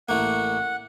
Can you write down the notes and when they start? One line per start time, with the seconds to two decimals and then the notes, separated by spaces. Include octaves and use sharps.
0.09 A1 A3 A#3 F#5